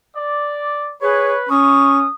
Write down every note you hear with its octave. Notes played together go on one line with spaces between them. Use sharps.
D5
G#4 B4 C#5
C#4 C#6 D#6